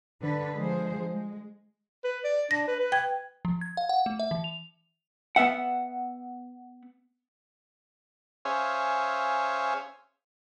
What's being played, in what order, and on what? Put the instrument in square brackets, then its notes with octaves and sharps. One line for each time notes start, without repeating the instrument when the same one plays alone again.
[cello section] D3 B4
D3 F3 G#3 G#4 C5
G#3
[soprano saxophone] B4
D5
[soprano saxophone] D4 [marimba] A#6
[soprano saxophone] B4
B4
[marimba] G5 G#6
[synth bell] F3
G#6
F5
F#5
A3
E5
E3
F7
[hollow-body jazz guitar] B3 B4 E5 F#5
[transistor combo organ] C#4 G#4 C5 C#5 E5 F5